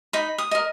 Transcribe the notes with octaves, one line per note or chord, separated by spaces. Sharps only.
D#4 B5
D#6
A#4 D#5